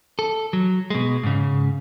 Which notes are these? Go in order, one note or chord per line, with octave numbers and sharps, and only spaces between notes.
A4
F#3
B2 G#3
G#2 C#3